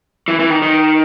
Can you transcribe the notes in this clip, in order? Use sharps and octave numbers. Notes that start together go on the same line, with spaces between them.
E3
E3
D#3
D#3